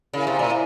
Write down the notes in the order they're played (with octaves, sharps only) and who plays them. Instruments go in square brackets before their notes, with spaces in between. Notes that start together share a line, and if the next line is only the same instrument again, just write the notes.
[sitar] C#3 [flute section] E4 A#4 F5 G#5
[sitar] C3
A#2